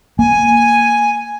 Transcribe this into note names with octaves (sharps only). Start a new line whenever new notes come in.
A#3 G#5